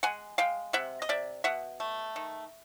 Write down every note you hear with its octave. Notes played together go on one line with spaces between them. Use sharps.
G#3 F#5 G#5
G#3 F5 G5
C3 E5 F#5
D#5
C3 D5 E5
B2 E5 F#5
A3
D#3